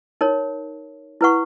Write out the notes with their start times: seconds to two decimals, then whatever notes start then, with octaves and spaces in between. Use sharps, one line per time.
0.21 D#4 A#4 C#5
1.21 E4 B4 F#5 C#6